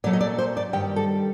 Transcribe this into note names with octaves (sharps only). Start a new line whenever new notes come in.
A#2 F#3 A3 D5
D#5
D5
C5
D5
G2 D#3 G3 G5
A4